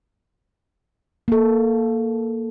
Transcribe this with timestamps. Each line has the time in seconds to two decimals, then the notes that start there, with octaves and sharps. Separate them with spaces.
1.28 A#3 A4